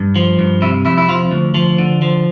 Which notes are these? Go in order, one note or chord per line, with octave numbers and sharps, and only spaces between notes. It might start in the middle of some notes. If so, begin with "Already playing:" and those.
Already playing: G2
F3
G2
C3 E4
F2 E4
E4
F3 F4
D2
F3
D3
F3